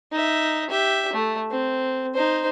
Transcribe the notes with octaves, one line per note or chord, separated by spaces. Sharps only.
D#4 E5
G4 E5
A3
C4
D#4 C5